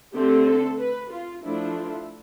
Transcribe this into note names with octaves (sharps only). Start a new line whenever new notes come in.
D3 A3 C4 G4
A4
B4
F4
F3 A3 D4 E4
E4